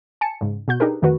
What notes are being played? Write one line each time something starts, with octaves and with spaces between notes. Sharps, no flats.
G#5 A5 C#7
G#2 C#3
B2 F#4 G6
D4 D#4 G4 G#4 A#4 B4
F2 D#3 A3 F#4 B4